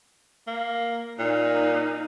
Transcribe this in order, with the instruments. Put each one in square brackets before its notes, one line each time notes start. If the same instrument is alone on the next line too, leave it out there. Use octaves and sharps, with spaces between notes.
[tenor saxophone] A#3
[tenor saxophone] A#2 [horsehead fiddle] D#4